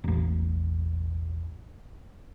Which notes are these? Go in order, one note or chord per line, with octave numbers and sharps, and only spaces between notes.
E1 A1